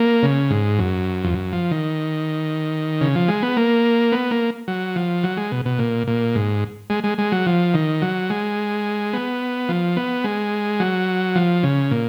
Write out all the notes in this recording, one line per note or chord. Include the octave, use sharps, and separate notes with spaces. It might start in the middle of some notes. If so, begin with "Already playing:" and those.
Already playing: A#3
C#3
G#2
F#2
F2
F#2
F3
D#3
C#3
F3
G#3
B3
A#3
B3
A#3
F#3
F3
F#3
G#3
B2
B2
A#2
A#2
G#2
G#3
G#3
G#3
F#3
F3
D#3
F#3
G#3
B3
F3
B3
G#3
F#3
F3
C#3
A#2